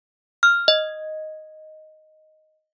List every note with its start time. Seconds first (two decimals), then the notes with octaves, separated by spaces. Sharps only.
0.43 F6
0.68 D#5